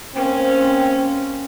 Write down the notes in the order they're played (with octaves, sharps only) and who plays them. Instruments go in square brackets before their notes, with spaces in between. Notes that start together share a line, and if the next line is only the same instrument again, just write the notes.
[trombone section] A#3 C4 [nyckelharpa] C#4